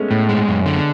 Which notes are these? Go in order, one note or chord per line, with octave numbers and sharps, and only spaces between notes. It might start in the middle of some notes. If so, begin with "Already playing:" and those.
Already playing: G#3 A3 B3 C#4
A2
G#3
F#2
D3